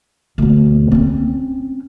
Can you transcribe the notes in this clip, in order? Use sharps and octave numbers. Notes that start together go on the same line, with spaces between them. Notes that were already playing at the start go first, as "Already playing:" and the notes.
D2 B2
C4 C#4